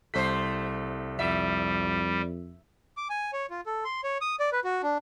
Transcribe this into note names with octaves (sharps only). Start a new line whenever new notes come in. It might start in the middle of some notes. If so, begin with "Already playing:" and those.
C2 A3 A4 C5 B6
F2 G3 E5
D6
G#5
C#5
F4
A4
C6
C#5
D#6
D5
B4
F#4
D4